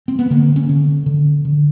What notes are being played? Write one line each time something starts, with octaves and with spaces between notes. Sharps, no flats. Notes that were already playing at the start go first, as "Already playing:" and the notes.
C4
B3
D3 A#3
C#4
D3
D3
D3